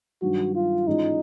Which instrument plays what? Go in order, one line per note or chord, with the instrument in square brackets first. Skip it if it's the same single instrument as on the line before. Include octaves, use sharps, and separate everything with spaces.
[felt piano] G2 D#3 F#3 [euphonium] F#4
[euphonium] F4
[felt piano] G#2 E3 G#3 C#4 F4 [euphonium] D#4